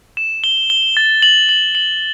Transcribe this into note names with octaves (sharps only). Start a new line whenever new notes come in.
E7
G7
G7
A6
F#7
F#7
F#7